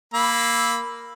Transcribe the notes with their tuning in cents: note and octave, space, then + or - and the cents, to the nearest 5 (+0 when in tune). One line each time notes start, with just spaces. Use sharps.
A#3 +0 B5 +0 E6 +0